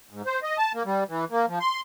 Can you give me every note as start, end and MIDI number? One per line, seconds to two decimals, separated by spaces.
0.11 0.22 44
0.26 0.40 72
0.43 0.57 75
0.58 0.72 81
0.74 0.83 58
0.85 1.04 55
1.09 1.25 52
1.31 1.46 58
1.48 1.59 53
1.60 1.81 84